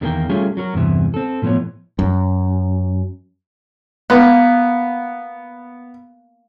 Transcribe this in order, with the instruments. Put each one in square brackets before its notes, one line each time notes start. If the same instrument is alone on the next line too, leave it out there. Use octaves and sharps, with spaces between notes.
[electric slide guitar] E2 D#3 G3 A#3 A#4 G5
G3 A3 C#4 F4 G4 G#4
F#3 F#4 A#4
E2 G2 C3 E3
C4 A4
A2 F3 A#3 B3 C#5
[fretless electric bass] F#2
[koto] A#3 [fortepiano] B3